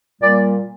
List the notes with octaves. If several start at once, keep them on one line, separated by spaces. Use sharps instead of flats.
A#2 G3 A#3 D5